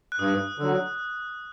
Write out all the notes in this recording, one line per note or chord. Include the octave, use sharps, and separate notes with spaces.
F#6
G2 D#6
D3 F#3